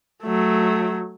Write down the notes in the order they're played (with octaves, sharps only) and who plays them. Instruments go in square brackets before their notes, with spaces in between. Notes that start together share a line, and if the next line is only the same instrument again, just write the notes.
[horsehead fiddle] F#3 A3